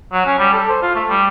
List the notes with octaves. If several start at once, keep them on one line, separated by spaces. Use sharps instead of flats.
F#3
C#4
G3
A4
C5
F4
A3
G3